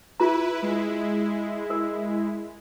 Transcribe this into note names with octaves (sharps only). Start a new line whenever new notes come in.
E4 F4 G#4 B4 A#5
G#3 E4
A#4